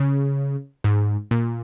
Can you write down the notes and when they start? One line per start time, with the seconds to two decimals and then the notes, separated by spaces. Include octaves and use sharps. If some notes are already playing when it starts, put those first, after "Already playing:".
Already playing: C#3
0.84 G#2
1.31 A#2